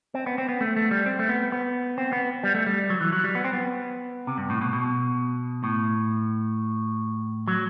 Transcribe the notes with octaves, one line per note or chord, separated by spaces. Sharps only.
C4
B3
C4
B3
A3
A3
G3
C4
A3
B3
B3
C4
B3
G3
A3
G3
F#3
E3
F#3
G3
B3
C4
B3
C3
G2
A2
B2
B2
A2
F#3